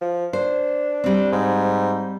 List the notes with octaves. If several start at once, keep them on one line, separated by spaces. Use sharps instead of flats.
F3
D4 C5
G3 C4
G#2